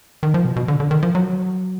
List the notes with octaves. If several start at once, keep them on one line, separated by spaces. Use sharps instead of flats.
D#3
F3
B2
B2
D3
D3
D#3
F3
F#3